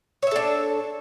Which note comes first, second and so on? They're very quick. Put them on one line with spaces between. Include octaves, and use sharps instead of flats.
C#5 E5 A4 D4